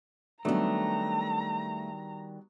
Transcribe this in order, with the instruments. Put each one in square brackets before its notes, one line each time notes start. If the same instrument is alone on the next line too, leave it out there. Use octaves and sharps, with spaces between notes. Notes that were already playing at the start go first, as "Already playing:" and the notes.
[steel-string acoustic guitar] D#3 G3 [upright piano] F#3 B3 D4 [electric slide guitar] A3 [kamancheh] A#5